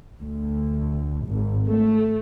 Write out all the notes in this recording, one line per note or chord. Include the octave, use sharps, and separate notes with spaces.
D2
G#1
A3